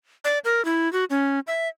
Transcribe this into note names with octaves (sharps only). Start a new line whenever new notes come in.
D5
A#4
E4
F#4
C#4
E5